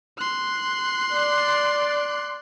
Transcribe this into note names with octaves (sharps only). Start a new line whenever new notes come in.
C6 F#6
D5